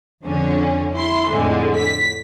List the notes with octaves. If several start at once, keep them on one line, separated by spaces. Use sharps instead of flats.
F2 D3 C#4
E4 C6
F2 A2 D3 G#3
B6